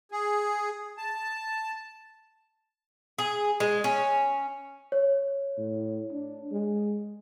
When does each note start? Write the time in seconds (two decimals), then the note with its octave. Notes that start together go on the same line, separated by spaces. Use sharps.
0.11 G#4
0.98 A5
3.18 G#4
3.60 G#3
3.84 C#4
4.92 C#5
5.58 A2
6.12 D4
6.52 G#3